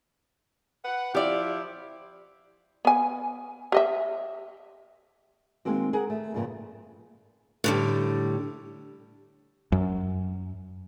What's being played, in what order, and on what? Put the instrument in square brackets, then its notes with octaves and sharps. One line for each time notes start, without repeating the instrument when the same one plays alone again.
[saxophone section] B4 F#5
[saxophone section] F3 E4 [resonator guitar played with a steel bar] G4 D5
[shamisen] B3 G#5
G4 D#5 E5
[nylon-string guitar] D#3 G#3 A#3 C4 F#4
G#4 A#4 F#5
A3
G2 A#2 C#3 F3 A#3 B3
[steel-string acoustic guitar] A2 D3 G3
[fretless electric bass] F#2